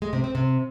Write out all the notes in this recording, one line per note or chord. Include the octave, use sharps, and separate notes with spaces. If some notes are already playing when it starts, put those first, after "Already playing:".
G#3
C3
C4
C3